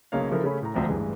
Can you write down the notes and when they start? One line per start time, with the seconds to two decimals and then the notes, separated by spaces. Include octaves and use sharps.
0.12 B1 C#3 G#3 A#3 C#5 F5
0.31 C#3 F3 E4 A4 A#4
0.43 C#3 A3 C#4 B5
0.62 A2 A#5
0.74 E1 D2 F3 G5 A#5
0.88 A1 G2 E3 G#3